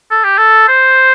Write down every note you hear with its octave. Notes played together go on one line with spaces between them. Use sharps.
A4
G4
A4
C5